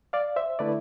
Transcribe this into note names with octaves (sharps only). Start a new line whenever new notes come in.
D5 F5
C5 E5
D3 A3 E4 B4 D5